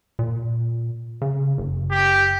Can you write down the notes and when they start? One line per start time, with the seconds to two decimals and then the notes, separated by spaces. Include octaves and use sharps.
0.19 A#2
1.22 C#3
1.58 F#1
1.91 G4